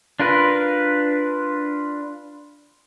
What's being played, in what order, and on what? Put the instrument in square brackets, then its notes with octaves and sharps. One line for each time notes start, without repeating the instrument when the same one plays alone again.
[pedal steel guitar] D4 F4 A#4 B4